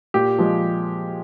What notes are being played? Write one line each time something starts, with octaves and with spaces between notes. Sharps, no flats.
A#2 G4
F3 G#3